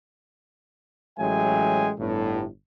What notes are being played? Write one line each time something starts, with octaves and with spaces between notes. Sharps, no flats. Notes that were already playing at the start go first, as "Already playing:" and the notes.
A1 F#3 G#3 E5 G5 G#5
G1 A2